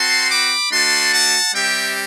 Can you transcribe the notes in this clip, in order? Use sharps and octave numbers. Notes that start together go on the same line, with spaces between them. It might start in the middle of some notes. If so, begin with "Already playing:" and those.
Already playing: C4 F#4 A5 C6
B5 D6
A3 D4 F#4 A5 C6
F#5 A5
G3 C4 G4 E5 G5